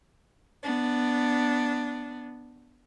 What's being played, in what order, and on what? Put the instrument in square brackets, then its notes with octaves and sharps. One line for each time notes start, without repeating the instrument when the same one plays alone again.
[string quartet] B3 D4